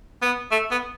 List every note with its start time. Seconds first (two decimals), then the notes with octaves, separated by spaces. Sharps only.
0.22 B3
0.51 A3
0.71 B3